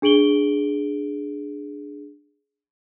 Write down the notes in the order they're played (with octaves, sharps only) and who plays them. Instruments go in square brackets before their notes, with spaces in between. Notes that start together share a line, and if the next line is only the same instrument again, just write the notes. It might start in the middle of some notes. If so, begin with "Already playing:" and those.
[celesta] D4 G#4 D7 F#7 G7